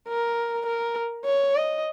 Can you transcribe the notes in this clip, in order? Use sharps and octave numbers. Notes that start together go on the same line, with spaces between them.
A#4
A#4
C#5
D#5